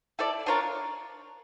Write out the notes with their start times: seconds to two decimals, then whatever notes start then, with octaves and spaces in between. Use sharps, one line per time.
0.19 E4 A4 D5
0.46 D4 F4 A#4 C#5